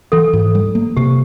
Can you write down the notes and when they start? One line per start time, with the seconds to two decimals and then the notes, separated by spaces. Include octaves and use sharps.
0.12 E3 A4
0.33 G#2
0.55 G3
0.75 A#3
0.97 C3 G4